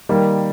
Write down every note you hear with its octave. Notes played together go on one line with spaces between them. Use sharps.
D#3 G3 A#3